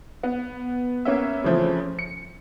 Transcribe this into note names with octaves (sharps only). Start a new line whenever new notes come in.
B3
A#3 B3 C#4 E5
C#3 E3 F3 A3 C4
C#7